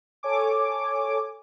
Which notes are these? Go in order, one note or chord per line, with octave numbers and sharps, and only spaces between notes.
A4 C#5 G#5 D6